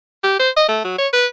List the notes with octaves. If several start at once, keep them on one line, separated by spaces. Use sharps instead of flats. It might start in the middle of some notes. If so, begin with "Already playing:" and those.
G4
C5
D#5
A3
F#3
C#5
B4